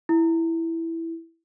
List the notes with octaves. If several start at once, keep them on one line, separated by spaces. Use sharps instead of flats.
E4